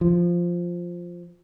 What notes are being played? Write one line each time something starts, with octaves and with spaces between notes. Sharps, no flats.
F3